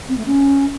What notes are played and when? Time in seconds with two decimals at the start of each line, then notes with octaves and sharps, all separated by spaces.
0.08 C4
0.17 A3
0.26 C#4